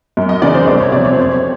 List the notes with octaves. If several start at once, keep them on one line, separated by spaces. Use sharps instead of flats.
F#2
D#5
C#3 E3 D5
C5
C2 D5
C#5
C3 F3 D5
C#5
C5
F2 C#5